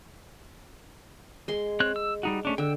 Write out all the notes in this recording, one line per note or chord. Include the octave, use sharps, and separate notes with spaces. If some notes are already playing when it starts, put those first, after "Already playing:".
G#3 C6
C4 C#5 F#6
E6
G3 D#4 F#4
A3 C#4 D4
D3 G5 E6